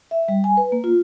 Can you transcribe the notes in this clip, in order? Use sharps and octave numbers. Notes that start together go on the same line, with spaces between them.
E5
G3
G#5
B4
A#3
F4